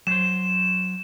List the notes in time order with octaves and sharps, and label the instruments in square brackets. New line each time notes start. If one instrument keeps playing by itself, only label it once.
[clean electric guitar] F#3 C5 [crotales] E7